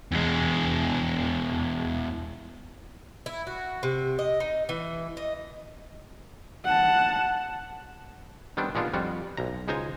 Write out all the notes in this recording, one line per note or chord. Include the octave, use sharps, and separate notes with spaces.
E2 G#3
E4
F#4
C3
D#5
D#4
E3
D#5
F#5 A5
D#3 G3 B3 C4 D4
A#2 G#3 B3 D4 D#4 F4
F2 G3 F4 F#4
B1 A#5
C#2 G#3 D#4 C5 G#5 A#5